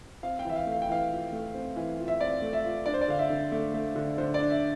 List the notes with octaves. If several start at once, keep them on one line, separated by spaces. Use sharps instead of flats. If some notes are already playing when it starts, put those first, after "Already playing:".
C4 F5
G5
E3 E5
F5
A3
F5
G5
E3 F5
F4
A3
C4
E3
F4
E5
C4 D5
A3
E5
F4
D4 D5
C5
D5
D3 F5
E5
D3
A3
A3
D3
D3 C5
D5
D4
E5